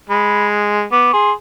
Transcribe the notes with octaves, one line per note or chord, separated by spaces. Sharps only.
G#3 B5
B3 D6
G#4 C6